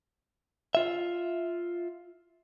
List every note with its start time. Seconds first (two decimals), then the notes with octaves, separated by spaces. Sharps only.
0.75 F4 E5